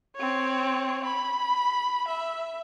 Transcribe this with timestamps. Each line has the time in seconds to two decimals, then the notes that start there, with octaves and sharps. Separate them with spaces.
0.16 C4 C#5
1.04 B5
2.08 E5